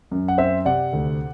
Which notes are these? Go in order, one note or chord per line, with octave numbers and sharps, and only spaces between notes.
F#2
F#5
C4 C5 E5
C3 D5 F#5
D2